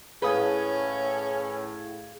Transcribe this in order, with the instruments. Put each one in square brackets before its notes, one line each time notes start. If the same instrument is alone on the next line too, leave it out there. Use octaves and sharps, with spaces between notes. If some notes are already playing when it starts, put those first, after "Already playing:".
[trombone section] A2 [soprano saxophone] C#4 [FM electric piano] G#4 F5 G#6 [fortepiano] B4 D#6